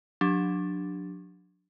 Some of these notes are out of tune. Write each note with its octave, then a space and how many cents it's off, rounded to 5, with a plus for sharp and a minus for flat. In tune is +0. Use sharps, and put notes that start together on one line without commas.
F#3 -40 D4 +0 G4 +0